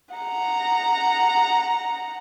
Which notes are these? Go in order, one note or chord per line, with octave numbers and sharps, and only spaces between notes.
F#5 A#5